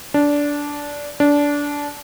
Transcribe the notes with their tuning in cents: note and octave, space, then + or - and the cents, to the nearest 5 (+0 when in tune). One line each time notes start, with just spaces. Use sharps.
D4 -15
D4 -20